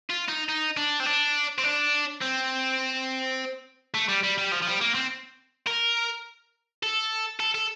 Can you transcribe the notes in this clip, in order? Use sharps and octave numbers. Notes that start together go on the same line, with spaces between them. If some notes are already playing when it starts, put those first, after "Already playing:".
F4
D#4
D#4
D4
C4
D4
C4
D4
C4
A3
G3
G3
G3
F3
F3
G3
A#3
C4
A#4
A4
A4
A4